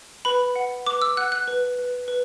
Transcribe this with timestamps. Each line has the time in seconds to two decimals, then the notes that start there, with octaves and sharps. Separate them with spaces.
0.25 B4 B5
0.56 F#5
0.86 B4 D6
1.02 E6
1.17 F#5 F#6
1.32 F#6
1.48 B4
1.79 B4
2.08 B4